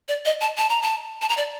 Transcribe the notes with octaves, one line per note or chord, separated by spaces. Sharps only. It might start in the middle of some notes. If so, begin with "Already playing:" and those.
D5
D#5
A5
A5
A#5
A5
A5
A#5
D5